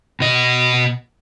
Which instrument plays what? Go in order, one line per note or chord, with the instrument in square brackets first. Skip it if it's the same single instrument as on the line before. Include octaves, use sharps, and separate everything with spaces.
[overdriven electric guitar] B2 D#5